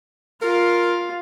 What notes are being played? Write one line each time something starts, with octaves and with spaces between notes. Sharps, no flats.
F4 A#4 F5